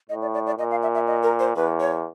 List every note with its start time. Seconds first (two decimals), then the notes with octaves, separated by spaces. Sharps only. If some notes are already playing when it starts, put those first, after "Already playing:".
0.09 A2 D#5
0.22 D5
0.34 D5
0.46 D5
0.58 A#2 D#5
0.71 F5
0.83 E5
0.94 E5
1.07 D#5
1.23 A#4
1.39 C5
1.56 E2 B4
1.80 C#5